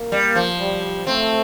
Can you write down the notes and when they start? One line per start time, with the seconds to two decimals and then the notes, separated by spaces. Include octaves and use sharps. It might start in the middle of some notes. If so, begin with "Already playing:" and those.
Already playing: A#3
0.12 G3
0.35 F3
0.59 G3
1.07 A3 C4